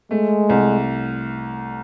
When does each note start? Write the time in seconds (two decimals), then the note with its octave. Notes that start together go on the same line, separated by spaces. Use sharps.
0.11 G#3 A3
0.49 C2